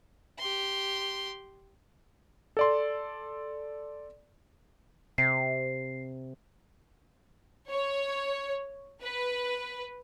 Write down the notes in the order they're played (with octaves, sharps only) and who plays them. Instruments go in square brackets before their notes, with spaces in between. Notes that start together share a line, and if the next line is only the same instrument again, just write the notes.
[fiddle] G4 C6
[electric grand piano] A4 D5 C6
[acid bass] C3 [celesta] C7
[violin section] C#5
B4